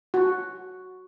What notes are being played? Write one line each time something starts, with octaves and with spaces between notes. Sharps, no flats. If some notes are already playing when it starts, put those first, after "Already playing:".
F#4